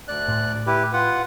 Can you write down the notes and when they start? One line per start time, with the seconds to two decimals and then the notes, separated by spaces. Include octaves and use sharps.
0.08 D2 D5 F#6
0.28 A2
0.67 E4 G4 B4
0.93 F4 B4 F#5